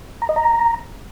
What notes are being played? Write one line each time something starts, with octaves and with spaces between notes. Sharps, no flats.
A#5
D#5
A#5